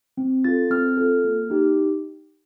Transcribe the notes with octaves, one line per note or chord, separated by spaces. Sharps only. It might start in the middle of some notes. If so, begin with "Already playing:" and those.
C4
F4 A4 A6
C4 F6
F4 A4
A#3
D#4 G4